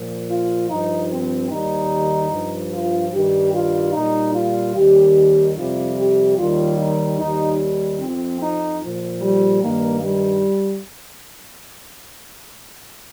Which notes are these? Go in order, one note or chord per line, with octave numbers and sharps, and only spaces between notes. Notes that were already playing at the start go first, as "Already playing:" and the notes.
Already playing: A#2 F3
F4
G2 F3 D#4
C4
D#2 D#3 G3 D#4
G2 F3
F4
G2 D#3 G3 G4
F4
A#2 G3 D#4
F4
D#2 D#3 G3 G4
F2 C3 G3 F4
G4
D#2 D#3 G3 F4
D#4
D#2 D#3 G3 D#4
F2 F3 C4
D#4
A#2 F3
G3
G2 D#3 G3 A#3
G3